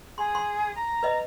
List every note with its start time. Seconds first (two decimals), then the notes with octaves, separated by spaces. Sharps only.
0.18 G#4 C6
0.35 C6
0.75 A#5
1.03 B4 D#5